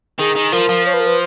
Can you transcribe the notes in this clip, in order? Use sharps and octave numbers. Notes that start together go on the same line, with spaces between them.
D#3 G#4
D#3
F3 A#4
F3
C#5
B4
A#4
B4